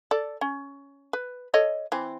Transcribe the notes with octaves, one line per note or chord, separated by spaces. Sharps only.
A4 D5
C#4
B4
A4 C#5 D#5
E3 C4